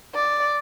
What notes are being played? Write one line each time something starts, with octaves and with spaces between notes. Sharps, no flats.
D5